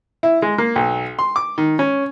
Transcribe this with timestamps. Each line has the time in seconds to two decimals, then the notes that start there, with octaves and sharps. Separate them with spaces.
0.23 E4
0.42 G#3
0.58 A#3
0.76 B1
1.19 C6
1.36 D6
1.58 D#3
1.79 C#4